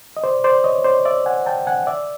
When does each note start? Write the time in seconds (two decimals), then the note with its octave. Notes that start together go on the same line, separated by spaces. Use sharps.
0.17 D#5
0.24 C5 D5
0.44 C5 D5
0.64 C#5 D#5
0.84 C5 D5
1.05 D5 E5
1.26 F#5 G#5
1.46 G5 A5
1.67 F#5 G#5
1.87 D5 E5